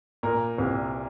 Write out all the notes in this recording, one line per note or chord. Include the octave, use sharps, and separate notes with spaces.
A#2 A#4
C2